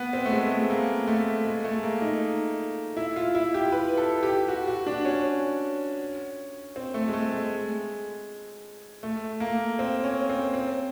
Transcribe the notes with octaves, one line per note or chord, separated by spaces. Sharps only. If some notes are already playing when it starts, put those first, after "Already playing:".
Already playing: B3
C4
A3
G#3
A3
A#3
A3
G#3
A3
A#3
D#4
E4
F4
E4
G4
B4
A4
G4
F#4
F#4
D4
C#4
C4
A3
G#3
A3
G#3
A3
A#3
C4
C#4
C4
C4